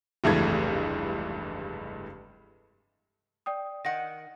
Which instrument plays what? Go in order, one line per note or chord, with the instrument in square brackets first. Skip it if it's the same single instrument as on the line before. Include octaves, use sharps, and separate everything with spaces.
[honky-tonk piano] F1 C#2 G2 E3 A3 G#6
[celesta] D5 G5 D#6
[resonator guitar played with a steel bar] D#3 F#5 [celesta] A#6